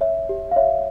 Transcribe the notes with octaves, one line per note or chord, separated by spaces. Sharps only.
C#5 E5
G4
F5
C#5 E5